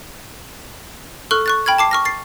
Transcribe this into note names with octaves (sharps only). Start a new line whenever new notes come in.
A4 C#6 F6 F#6
C#6 F#6 A6
G5 B5 F6 G#6
A5 D6 C7
C#6 F6 A#6
A6 C7